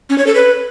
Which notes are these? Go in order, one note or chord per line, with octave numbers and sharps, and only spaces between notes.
C#4
C#5
A4
B4